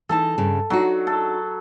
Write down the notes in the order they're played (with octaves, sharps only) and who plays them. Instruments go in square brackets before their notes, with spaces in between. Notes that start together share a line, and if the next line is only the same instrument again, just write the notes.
[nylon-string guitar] E3 D#4 A5 [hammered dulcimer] A4
[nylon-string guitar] G2 C#3
[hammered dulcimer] F#3 [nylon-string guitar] D4 D#4 F#4
[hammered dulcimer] A4